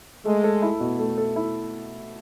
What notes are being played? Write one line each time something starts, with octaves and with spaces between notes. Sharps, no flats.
G#3 A3
A4
E4
B2
A3
A4
E4